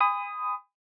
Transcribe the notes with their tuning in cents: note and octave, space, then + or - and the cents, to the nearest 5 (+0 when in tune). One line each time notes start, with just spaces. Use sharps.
G#5 -35 B5 +30 D#6 +0